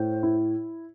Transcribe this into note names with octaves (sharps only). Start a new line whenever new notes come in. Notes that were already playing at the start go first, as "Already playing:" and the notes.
Already playing: A2 C5
E4